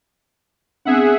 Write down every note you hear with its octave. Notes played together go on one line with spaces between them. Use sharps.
B3 C4 D4 G#4 E5 F#5